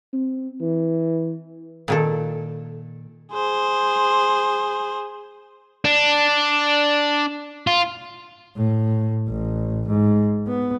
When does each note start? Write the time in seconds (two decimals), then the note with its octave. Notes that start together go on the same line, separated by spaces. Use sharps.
0.13 C4
0.61 E3
1.88 A#2 D#3 A4
3.32 G#4 C5
5.85 D4
7.67 F4
8.56 A2
9.28 A1
9.88 G#2
10.47 B3